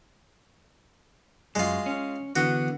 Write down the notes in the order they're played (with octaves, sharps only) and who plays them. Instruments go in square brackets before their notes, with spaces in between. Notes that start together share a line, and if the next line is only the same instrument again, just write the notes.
[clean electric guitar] F#2 [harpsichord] G#3 F4
[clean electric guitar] C#4
[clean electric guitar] D3 E3 B3 [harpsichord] F#4